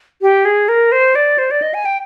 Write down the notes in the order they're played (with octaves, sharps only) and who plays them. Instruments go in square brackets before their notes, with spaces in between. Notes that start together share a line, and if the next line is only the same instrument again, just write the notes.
[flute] G4
G#4
A#4
C5
D5
C5
D5
D#5
G#5
G5